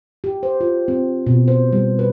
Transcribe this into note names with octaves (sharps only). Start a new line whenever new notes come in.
G4
C5
F4
C4
B2
C5
G3
B4